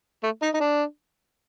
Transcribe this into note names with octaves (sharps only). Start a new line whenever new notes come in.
A3
D#4
D#4
D4